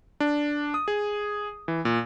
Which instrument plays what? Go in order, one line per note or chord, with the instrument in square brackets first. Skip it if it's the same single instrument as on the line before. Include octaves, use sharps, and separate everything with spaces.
[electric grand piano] D4
D#6
G#4
E3
A#2